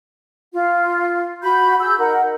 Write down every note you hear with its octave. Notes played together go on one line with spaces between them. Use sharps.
F4
F#4 B5 G6
G#4 E6 G6
D#4 A#4 F#5